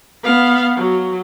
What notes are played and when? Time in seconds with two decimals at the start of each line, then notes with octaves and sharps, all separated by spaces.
0.23 B3 F5
0.76 F#3